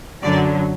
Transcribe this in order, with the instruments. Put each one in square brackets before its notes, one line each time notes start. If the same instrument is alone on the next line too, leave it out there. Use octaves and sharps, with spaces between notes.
[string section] F#2 D3 F#3 D5